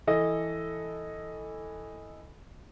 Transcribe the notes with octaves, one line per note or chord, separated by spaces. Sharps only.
E3 A4 D#5